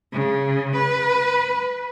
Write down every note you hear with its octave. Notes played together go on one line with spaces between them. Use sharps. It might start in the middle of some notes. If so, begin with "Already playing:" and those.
C#3
B4